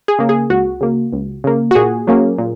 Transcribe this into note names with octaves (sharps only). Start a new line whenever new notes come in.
G#4
C#3 A#3
G#4
C#2 F#4
C#3 A#3
C#2
C#3 A#3
F#4
A#2 G#4
F#3 A#3 C#4
A#2